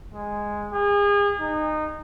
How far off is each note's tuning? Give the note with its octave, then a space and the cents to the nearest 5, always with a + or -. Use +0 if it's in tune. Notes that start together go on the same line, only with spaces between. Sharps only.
G#3 -5
G#4 -35
D#4 -20